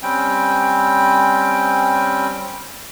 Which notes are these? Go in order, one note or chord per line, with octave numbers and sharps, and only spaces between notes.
G3 C4 C#4 G5